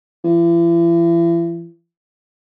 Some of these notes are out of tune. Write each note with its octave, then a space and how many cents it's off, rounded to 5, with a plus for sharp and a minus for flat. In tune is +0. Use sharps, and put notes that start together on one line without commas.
E3 +40